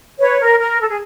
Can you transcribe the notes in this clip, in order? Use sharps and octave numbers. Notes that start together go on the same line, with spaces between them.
B4 C#5
A#4
A#4
A4
G#4